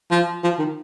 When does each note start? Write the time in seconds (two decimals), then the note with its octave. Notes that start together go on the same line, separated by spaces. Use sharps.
0.11 F3
0.44 F3
0.59 D#3